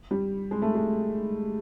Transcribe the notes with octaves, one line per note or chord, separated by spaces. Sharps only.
G3
G#3
A3
G#3